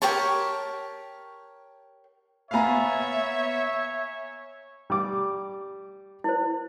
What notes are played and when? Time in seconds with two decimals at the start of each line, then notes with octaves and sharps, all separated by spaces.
0.02 G4 A#4 C#5 A5
2.51 A#2 B3 C#5 E5 F5 G#5 A#5
4.90 G3 D6
6.24 E4 C5